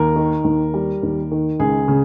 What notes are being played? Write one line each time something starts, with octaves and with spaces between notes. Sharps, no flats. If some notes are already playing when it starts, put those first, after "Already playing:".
Already playing: D#2 A#4
D#3
D#2
G3
D#2
D#3
C#2 G#4
C#3